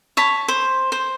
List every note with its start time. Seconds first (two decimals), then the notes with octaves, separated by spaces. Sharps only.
0.17 C#5 A5 B5
0.48 C5
0.92 C5